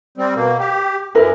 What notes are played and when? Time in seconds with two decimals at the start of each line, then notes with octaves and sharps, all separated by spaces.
0.18 G3 C4
0.35 B2 A#3
0.59 G4
1.15 F#2 E4 A#4 B4